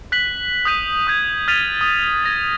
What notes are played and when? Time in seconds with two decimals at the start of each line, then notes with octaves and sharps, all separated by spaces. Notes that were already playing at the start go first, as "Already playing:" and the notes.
0.12 F#6 B6 F#7
0.65 D#6 F#6 G6 B6 D#7
1.07 D#6 G6 G#6 B6
1.48 F6 G#6 A6 B6 D#7 F7
1.81 D#6
2.24 G#6 A#6